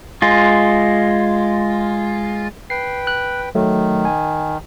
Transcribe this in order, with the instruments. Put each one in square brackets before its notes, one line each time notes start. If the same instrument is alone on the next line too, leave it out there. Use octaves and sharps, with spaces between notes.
[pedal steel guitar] G#3 F4
[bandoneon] B4 G5 [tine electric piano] C7
[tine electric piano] F#6
[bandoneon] D#3 [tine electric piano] F#3 A3
[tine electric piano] G#5